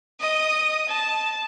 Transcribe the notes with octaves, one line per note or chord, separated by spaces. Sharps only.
D#5 D#6
A5